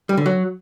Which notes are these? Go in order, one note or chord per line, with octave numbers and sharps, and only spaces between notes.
G3
D3
F#3